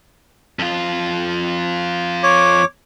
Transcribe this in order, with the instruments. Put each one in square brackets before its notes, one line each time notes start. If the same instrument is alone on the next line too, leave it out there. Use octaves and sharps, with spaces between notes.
[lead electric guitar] F2 F4
[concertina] C#5 D6